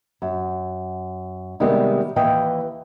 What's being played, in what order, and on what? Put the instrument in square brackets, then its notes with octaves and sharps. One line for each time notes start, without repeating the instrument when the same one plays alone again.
[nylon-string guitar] F#2
C3 D#3 G3 G#3 B3 G4
D#2 E3 B4 D#5 G5